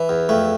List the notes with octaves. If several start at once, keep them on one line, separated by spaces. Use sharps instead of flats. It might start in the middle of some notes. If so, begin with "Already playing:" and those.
Already playing: E3
E2
F2 A3